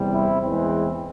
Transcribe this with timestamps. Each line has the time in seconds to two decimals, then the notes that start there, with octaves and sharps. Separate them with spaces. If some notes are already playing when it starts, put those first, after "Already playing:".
Already playing: E2 C3 G3
0.13 C4 E4
0.42 E2 E3 G#3 C4